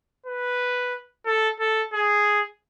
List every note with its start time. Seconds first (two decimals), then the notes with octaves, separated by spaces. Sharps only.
0.26 B4
1.26 A4
1.60 A4
1.93 G#4